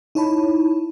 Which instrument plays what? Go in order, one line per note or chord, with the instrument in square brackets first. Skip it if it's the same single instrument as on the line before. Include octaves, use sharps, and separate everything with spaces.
[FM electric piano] D#4 E4 C#5 A5 B5